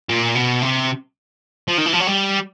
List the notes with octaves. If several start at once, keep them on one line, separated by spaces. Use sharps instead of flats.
A#2
B2
C3
F3
D#3
E3
F3
F#3
G3